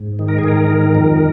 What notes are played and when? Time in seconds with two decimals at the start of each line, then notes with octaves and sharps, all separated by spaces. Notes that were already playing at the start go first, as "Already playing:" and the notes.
Already playing: G#2
0.19 D#3
0.28 A#4
0.38 G#4
0.44 G#2 A#4
0.70 D#3
0.95 F2